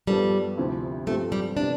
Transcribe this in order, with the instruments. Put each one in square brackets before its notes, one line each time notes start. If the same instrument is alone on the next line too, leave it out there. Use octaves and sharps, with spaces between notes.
[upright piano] G2 F3 B3 D4 A4 [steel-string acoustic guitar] G3
[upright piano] D2 C3 F3 C4 E4
[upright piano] G2 F3 C4 G4 [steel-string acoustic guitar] A3
[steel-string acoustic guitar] G3
[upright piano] C3 E3 G3 B3 [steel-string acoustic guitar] D4